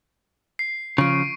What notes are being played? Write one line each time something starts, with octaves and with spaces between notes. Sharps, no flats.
C7
C#3 F3 C#6 D7